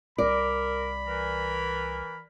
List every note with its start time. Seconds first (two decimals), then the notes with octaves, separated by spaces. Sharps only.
0.18 C2 G3 A#4 D5 B5
1.06 E3 A#4